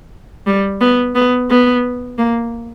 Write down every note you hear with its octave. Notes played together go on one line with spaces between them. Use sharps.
G3
B3
B3
B3
A#3